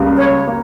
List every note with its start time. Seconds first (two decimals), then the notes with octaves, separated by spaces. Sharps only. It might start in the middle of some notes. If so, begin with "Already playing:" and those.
Already playing: C#2 C#3 G3 A#3
0.16 C#5
0.47 A#3